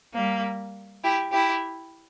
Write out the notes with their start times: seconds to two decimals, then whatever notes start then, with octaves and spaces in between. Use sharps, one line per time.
0.12 G3 A#3
1.03 E4 G4
1.32 E4 G4